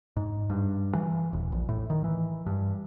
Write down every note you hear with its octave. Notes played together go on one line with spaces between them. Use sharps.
G#2
G2
E3
D#1
A#1
A2
D#3
E3
G2